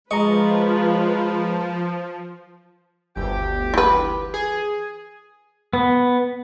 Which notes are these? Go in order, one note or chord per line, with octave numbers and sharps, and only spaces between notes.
F3 G#3 F4 B4 D#5 A#5 C#6
G1 D2 G4
E3 B4
G#4
B3